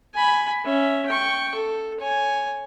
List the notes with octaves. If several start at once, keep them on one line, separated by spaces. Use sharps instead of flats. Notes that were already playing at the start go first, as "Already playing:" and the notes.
G#5 B5
C#4 E5
G5 C#6
A4
C#5 G#5